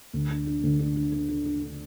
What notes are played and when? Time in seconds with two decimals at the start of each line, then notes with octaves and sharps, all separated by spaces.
0.13 D2
0.29 D4
0.46 D4
0.63 D2
0.79 D4
0.96 D4
1.12 D4
1.29 D4
1.45 D4
1.62 D3